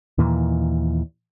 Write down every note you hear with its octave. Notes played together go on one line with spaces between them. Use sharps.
D#2 A#2 E3